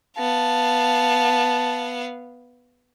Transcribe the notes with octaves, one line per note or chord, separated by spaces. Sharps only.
B3 F5 A5